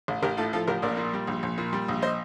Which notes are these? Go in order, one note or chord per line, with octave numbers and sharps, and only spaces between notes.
A1
A1 G4 A#4
A2 F4 A4
F3 F4 A4
A1 G4 A#4
A#1 A#4 D5
A#2
G3
A#1
A#1
A#2
G3
A#1
C5 D#5